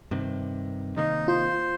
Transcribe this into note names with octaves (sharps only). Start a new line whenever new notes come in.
G2 C3 D#3
C3 D#3 A#3 D#4
F4 C5